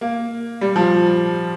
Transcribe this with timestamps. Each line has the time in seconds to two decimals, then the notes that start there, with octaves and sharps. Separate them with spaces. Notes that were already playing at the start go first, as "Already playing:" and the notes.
0.01 A#3
0.61 G3
0.76 F3